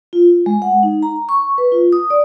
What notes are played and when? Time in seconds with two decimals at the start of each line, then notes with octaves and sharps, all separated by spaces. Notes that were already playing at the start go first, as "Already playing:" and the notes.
0.13 F4
0.46 G#3
0.62 F#5
0.83 D#4
1.03 A#5
1.29 C#6
1.58 B4
1.72 F4
1.92 D#6
2.10 D5